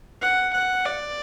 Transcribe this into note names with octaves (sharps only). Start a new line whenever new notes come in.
F#5
F#5
D5